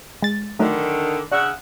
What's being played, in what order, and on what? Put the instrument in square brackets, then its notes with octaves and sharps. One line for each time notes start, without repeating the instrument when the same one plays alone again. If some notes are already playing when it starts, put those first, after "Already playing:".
[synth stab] G#3 A6
[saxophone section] D3 D#3 [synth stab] F#3 A3 D#4
[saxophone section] C#3 E5 F#5 [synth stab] D4